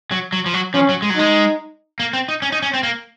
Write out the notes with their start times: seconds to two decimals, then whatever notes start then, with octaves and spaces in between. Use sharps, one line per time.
0.11 F#3
0.33 F#3
0.46 F3
0.54 F#3
0.74 F3 C#4
0.89 F#3
1.02 G#3
1.10 F#3
1.16 G#3 D#4
2.00 A#3
2.13 C4
2.28 D#4
2.42 C#4
2.52 D#4
2.62 C#4
2.74 C4
2.83 A#3